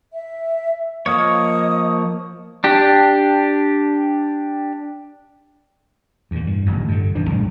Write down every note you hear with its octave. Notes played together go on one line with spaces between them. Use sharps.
E5
F3 A#3 C#5 D#5 D#6
D4 G4
E2 A#2
G2
D1 A1 A#2
G2 D3
D#1 F2 E3 D4
A#1 G#2 F#3